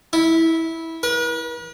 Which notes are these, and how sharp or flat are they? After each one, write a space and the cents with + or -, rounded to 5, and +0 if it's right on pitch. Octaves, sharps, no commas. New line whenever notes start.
E4 -15
B4 -45